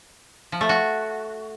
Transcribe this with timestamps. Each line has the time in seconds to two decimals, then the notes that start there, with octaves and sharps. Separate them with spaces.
0.52 F3
0.61 A3
0.69 F#4